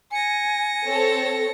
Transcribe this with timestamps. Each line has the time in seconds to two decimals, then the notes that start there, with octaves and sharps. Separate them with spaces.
0.11 G#5 A#6 C#7
0.87 C4 A4 C#5